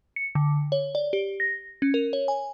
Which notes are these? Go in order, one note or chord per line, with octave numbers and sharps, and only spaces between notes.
C#7
D3
C#5
D5
G4
A#6
C#4
A#4
C#5
G#5